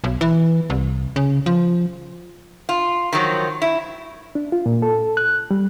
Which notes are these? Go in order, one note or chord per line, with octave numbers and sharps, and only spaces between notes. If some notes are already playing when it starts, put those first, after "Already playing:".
B1
E3
C2
C#3
F3
F4
D#3 F3 F#3
E4
D4
F4
A#2
A4
F#6
G3